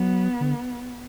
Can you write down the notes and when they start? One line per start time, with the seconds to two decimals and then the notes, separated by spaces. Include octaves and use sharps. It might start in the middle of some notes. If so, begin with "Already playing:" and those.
Already playing: F#3 B3
0.41 D3